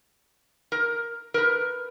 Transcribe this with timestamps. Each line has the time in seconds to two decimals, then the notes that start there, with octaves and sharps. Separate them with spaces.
0.72 A#4
1.34 A#4 B4